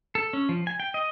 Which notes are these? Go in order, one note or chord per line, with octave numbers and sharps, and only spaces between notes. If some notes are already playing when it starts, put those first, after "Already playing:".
A4
C#4
F3
G#5
G5
D#5